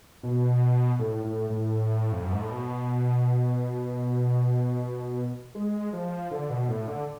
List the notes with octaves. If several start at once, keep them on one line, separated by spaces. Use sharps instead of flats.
B2
A2
A2
A2
F2
F#2
G#2
A2
B2
G#3
F3
D3
B2
A2
D3